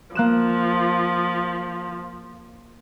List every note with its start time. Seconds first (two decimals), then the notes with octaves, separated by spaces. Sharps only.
0.15 F3 A#3 F#6 E7